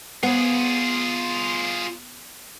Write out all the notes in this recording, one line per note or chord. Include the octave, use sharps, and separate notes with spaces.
B3 F4 G#4